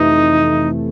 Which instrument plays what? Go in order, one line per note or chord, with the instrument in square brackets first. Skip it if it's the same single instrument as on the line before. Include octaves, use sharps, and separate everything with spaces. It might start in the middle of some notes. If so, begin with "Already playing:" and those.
Already playing: [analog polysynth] F2 C3 E3 A3 [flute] D#4